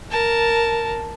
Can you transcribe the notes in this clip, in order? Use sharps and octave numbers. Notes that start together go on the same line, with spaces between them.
A#4 A5